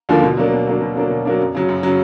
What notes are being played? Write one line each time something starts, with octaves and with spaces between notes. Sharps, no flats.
D#2 D3 F3 A#3
B2
F#3 A#3 D4
B2
F#3 A#3 D4
B2
F#3 A#3 D4
B2
F#3 A#3 D4
F#2
C#3 F#3
F#2
C#3 F#3